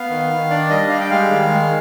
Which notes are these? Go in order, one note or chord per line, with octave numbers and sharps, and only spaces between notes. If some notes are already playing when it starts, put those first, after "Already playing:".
Already playing: B3 F5
D#3
D#3
D4 D5
G3 D#5
G3 F5
G5
G#3 F5
D#3
G#3